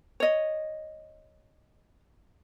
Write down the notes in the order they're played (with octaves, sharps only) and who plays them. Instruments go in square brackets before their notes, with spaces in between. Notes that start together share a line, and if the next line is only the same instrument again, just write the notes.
[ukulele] C#5 D#5